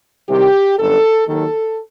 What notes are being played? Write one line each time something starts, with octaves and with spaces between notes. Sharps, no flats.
C2 C3 D#3 G4
G1 F#2 D3 F#3 A4
D#2 D#3 F#3 A4